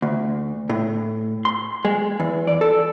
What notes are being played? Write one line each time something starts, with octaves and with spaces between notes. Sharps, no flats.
D2
A2
C6
G#3
E2
D5
A4